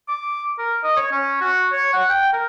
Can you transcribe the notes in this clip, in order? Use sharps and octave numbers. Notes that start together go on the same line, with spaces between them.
D6
A#4
D#5
C#5
C#4
F#4
C#5
F#5
G5
A#4